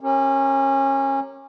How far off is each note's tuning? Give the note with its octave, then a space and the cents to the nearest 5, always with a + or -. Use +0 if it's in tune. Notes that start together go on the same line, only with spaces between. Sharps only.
C#4 -25 G4 +0 A#4 -15